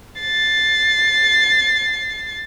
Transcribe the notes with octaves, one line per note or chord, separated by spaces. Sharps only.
A6 C7